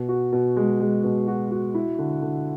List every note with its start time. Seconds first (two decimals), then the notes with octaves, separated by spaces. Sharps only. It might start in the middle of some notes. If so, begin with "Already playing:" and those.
Already playing: B2
0.09 F#4
0.33 B2
0.57 G#3
0.80 G#3
1.04 B2
1.28 F#4
1.51 F#4
1.75 E4
1.99 D3
2.22 D3